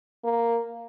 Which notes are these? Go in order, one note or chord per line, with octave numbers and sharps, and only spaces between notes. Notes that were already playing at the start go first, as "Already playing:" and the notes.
A#3